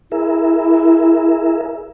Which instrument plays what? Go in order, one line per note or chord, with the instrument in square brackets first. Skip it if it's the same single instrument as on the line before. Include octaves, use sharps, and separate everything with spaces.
[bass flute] E4 [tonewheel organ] G#4 A#4 E5